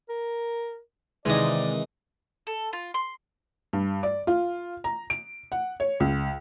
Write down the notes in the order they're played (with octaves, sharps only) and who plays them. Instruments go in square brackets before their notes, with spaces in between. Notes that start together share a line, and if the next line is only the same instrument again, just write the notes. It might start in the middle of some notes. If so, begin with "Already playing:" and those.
[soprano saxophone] A#4
[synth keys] C3 D#3 G#3 [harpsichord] E3 D#4 [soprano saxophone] D5
[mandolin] A4
F4
C6
[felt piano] G2
D5
F4
A#5
D7
F#5
C#5
C#2